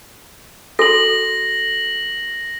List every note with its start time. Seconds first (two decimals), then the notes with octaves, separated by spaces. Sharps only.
0.79 F#4 A4 A#6 F#7